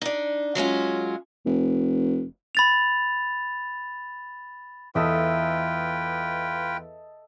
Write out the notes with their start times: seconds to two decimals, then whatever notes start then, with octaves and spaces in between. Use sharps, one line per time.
0.02 D4 D#4
0.55 F#3 G#3 C#4 F4
1.46 F1
2.55 B5 A6 F7
4.95 E2 F4 A4 B4 D#5 E5 G5